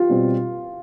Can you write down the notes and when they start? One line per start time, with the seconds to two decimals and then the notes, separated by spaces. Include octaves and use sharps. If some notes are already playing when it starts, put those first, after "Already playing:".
Already playing: F4 G4
0.09 B2 G3 C4